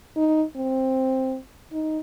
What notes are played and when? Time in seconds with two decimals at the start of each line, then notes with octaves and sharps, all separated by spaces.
0.17 D#4
0.56 C4
1.73 D#4